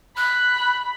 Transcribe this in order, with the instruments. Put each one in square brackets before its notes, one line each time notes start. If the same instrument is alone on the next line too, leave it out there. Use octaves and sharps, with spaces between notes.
[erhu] B5 [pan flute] F#6